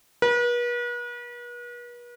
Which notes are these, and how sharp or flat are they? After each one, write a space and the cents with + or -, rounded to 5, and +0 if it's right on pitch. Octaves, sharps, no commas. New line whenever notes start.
B4 -40